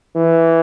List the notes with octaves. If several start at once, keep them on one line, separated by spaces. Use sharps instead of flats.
E3